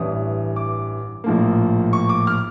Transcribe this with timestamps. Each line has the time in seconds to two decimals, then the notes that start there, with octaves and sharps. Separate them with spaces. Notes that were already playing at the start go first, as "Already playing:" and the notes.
Already playing: A1 G2 E3 D#6
0.56 D6
1.24 A#1 A2 F3 A#3
1.93 C#6
2.09 D6
2.27 F6